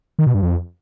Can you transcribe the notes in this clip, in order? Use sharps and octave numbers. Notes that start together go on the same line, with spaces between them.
D#3
B2
G2
F2